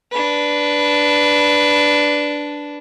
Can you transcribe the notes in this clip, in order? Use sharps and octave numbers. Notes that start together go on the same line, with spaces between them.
D4 B4